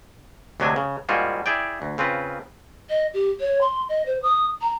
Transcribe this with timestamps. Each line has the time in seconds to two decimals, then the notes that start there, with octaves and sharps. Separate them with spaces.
0.60 D2 C3 F#3 G#3 D4 G#5
0.76 C#3
1.09 G#2 G3 A#3 F4 F#4 G#4
1.46 E4 G#4 D5 G5
1.82 D2
1.98 C#3 C4 F4 B4
2.89 D#5
3.14 G4
3.40 C#5
3.61 C6
3.89 D#5
4.06 C5
4.23 D#6
4.61 A#5